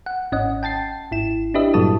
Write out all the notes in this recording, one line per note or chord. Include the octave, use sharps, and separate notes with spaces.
F#5
G#1 C#4 D#5 F#5
G5 A5 A6 C7
G#1 E4 E7
D4 E4 G4 B4 D#5 E5
G2 A#2 F#3 A4 A5 D#6